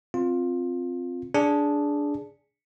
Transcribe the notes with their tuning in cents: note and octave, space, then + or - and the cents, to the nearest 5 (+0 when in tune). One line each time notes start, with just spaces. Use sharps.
C4 +0 F4 +10
D4 -10 G#4 +0